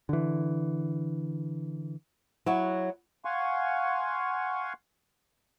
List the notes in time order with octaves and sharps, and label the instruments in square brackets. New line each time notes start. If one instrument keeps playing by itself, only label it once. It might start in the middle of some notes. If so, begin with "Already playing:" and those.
[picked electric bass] D3 E3
[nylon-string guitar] F#3 E4 F#4
[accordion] F5 F#5 G#5 C6 C#6